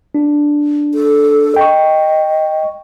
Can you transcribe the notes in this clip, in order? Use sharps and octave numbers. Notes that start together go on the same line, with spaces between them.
D4
A4
D#5 G5 C#6